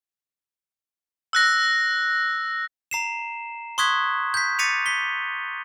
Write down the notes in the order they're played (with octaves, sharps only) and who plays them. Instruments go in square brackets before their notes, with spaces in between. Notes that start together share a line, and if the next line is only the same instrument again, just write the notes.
[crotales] E6 F#6 A#6
[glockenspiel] A#5 C7 E7
C6 C#6 D#6 F#6 G#6 B6
G6 B6
D6 A6 B6 C#7 D#7 F7
B6 G7